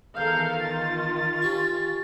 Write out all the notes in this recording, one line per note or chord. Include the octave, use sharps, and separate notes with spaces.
E2 D#3 A4 A#4 F5 G6
F4 A6
C#4 G4 C#6